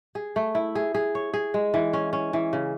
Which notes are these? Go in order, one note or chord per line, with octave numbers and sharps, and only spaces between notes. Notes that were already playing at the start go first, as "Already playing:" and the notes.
G#4
A3
E4
G#4
G#4
C#5
G#4
G#3
E3
C#4
C#4
E3
C#3